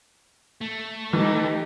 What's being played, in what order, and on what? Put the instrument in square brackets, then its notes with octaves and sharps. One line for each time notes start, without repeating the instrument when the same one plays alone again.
[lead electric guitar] A3
[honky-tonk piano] E3 [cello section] D#4 G4